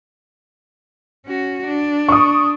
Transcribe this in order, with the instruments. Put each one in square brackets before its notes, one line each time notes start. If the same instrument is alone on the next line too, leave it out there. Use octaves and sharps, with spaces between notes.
[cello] C#4 F#4
D4
[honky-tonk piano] C#6 D#6